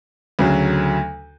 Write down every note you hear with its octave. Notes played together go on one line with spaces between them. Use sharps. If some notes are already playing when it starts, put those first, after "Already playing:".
D2 C#3 F#3